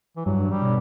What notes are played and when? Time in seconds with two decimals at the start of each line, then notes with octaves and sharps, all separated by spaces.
0.17 E3
0.26 G2 F#3
0.50 G3
0.62 B2